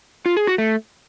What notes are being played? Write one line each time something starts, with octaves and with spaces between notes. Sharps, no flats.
F4
G#4
F#4
A3